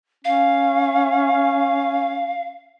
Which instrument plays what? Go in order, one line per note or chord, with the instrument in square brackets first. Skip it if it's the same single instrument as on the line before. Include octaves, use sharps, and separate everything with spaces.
[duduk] C#4 [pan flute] F5